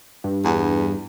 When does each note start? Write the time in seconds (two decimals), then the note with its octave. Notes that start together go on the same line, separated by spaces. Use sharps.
0.24 G2
0.45 E2